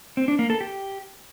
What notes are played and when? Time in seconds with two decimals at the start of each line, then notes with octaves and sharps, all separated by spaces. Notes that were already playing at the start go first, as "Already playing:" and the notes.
0.17 C4
0.28 D4
0.39 A#3
0.50 A4
0.61 G4